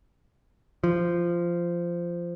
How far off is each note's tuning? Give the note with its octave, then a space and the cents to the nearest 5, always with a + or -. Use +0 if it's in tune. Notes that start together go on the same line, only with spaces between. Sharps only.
F3 -15